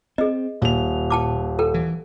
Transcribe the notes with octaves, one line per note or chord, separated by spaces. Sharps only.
C4 G#4 D#5
D#1 A#2 F7
G5 A5 D6
A4 A#4 G5
E3